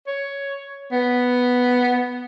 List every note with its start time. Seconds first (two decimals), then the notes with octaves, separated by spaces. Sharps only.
0.07 C#5
0.92 B3